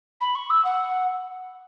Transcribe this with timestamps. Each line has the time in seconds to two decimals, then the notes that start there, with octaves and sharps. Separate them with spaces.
0.21 B5
0.35 C#6
0.50 E6
0.65 F#5